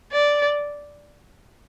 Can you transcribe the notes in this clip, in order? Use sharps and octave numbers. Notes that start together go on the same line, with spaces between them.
D5